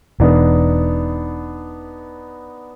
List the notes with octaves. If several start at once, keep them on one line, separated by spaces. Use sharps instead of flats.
E1 B3 D4 D#4